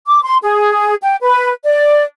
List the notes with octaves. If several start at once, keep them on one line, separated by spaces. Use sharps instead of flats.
D6
C6
G#4
G5
B4
D5